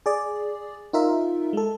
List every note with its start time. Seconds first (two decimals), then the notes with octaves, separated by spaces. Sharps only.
0.06 G#4 D5
0.93 D#4 F4 A#4 E5
1.53 G#3 A4